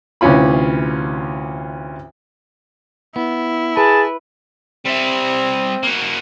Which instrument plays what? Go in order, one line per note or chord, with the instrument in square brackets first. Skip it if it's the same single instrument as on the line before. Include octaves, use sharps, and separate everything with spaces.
[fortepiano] D2 C3 E3 C#4 F4 B5
[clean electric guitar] B3 [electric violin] E4
[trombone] G#4 [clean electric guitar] B4 [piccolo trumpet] A5
[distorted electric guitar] G3 E5 [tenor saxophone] C4
[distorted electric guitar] A#3 F#4